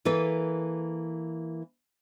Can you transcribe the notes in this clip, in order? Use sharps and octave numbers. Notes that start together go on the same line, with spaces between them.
E3 A#3 A4 B4